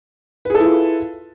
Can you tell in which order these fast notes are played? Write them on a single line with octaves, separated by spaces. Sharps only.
B4 G#4 A4 E4 F4